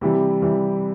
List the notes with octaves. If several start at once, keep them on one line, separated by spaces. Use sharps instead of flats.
C3 E3 G3
C3 E3 G3